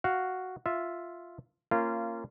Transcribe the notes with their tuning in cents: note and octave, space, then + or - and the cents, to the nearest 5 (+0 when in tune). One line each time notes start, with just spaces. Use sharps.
F#4 +0 F5 +0
F4 +0 E5 +0
A#3 -20 C#4 -25 F4 -25